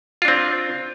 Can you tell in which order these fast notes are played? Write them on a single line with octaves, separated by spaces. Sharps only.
F4 D4 C4